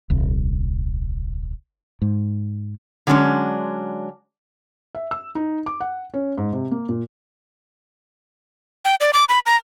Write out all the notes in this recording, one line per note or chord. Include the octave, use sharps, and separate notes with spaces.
D#1 C2
G#2
D3 F#3 G#3 C#4 D4
E5
E6
D#4
D6
F#5
C#4
G#2
C3
A#3
A#2
G5
D5
D6
B5
A#5